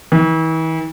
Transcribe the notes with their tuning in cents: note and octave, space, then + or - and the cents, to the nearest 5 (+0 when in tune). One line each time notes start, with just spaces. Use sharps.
E3 -40